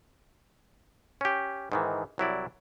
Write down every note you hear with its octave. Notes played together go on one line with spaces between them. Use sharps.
C#4 G4
G#2 D#3 E3
C2 F#3 E4 D5